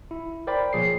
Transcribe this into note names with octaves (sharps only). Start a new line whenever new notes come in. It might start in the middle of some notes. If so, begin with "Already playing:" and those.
E4
A#4 C5 D5 G5 B5
A#2 F3 G#4 C#5 C7